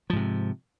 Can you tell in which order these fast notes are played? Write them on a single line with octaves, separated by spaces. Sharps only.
F3 G#2 C3